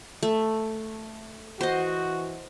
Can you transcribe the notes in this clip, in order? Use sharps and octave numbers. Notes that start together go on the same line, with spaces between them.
A3
E3 F#4 C5 D#5